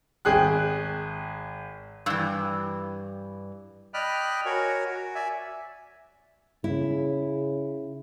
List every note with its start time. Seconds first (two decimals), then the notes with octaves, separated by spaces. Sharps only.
0.25 G#1 G#4 G5 F#6
2.06 G2 E3 G5 E6
3.94 D5 D#5 G5 B5 F6 F#6
4.46 F#4 A#4 C#5 G#5
4.86 F#4
5.15 D5 E5 G#5
6.64 C#3 E4